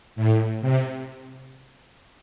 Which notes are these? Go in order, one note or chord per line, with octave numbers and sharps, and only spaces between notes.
A2
C3